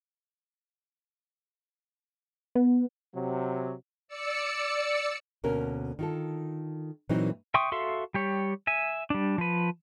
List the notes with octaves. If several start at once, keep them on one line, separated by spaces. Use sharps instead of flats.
B3
C3 F#3
D5 E6 C#7
D2 B2 A#3 C#4 A#4
D#3 F4 A4
A#2 E3 F#3 A#3 C4 D#4
E5 G5 C6 C#6 D#6
F#4 A4 E5 F5 C6
G3 G4 C#5
E5 G#5
G3 D4
F3 B4